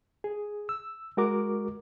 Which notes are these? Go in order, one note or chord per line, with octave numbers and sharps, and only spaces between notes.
G#4
E6
G#3 F#4 A#4 D6